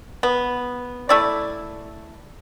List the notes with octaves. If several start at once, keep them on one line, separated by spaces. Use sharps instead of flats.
B3
A3 E4 D5